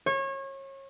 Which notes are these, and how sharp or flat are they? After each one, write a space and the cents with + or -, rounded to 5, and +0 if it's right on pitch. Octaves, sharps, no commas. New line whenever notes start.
C#5 -30